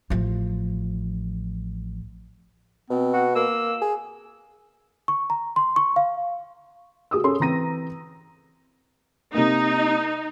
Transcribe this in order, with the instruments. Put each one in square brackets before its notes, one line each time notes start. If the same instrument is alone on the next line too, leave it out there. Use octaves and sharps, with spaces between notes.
[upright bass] A1 F3
[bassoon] B2 [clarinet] C4
[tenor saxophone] F#4
[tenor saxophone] A#3 [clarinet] E6
[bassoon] G#4
[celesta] C#6
A#5
C6
C#6
F5
[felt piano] F#4 G#4 D#6 E6
C#4 G#4 A4 C6
E3 C4 A#5 A#6 D#7
[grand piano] C3 A#3 [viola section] D#4